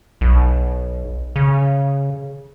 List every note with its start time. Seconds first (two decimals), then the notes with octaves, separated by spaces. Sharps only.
0.21 B1
1.36 C#3